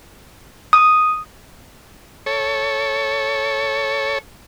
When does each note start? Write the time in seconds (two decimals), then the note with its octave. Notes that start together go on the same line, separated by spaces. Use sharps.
0.73 D#6
2.26 A4 C#5